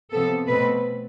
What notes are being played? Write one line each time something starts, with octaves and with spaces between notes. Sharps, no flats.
C3 F3 B3 A4
B2 A3 C4 B4